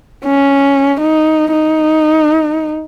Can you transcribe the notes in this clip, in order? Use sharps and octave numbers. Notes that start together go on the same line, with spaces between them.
C#4
D#4
D#4